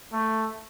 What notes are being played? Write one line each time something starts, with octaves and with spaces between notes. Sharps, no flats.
A3